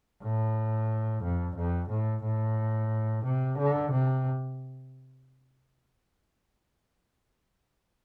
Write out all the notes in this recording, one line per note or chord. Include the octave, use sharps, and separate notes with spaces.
A2
F2
F2
A2
A2
C3
D3
C3